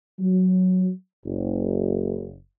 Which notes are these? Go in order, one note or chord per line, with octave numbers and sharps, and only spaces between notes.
F#3
F#1